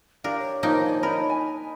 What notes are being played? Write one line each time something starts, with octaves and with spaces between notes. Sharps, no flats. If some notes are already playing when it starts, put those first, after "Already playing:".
D4 G4 A#4 D5 F5
C#5
D#3 F3 A#3 D#4 G5
D5 D#5 G#5
D4 D#4 A#4 B4 B5
G#5